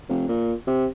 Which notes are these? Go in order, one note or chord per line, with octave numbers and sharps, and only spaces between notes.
F1
A#2
C3